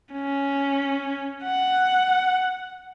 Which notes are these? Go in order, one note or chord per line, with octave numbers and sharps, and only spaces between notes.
C#4
F#5